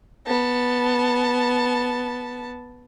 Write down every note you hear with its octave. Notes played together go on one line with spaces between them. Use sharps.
B3 A5